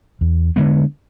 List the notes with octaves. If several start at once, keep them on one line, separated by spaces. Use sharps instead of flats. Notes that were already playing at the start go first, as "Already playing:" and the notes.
E2
D3 G#3 B3